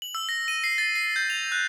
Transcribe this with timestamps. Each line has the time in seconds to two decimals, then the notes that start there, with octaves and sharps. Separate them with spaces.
0.02 F#7
0.15 E6
0.29 A#6
0.48 D#7
0.64 C7
0.78 A6
0.96 C7
1.16 G6
1.30 F7
1.52 F#6